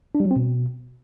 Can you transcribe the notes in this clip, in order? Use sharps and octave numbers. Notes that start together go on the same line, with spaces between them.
D4
G3
F#3
C4
B2